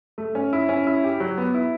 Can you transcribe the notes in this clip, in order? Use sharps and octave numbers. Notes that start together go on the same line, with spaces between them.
A3
C#4
E4
C#4
E4
G4
F#3
B3
E4